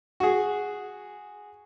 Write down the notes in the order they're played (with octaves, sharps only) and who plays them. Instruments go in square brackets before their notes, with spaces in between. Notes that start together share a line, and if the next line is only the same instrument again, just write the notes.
[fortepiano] F#4 G#4